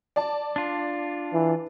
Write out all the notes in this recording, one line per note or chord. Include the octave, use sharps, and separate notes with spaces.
D5 A5
D4 F4
E3